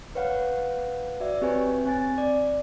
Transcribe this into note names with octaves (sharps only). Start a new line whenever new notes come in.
B4 C#5 F5 F#5
F#4 D5 E5
C4 G4 B4 C#5 G#5
C4 G#5 A6
D5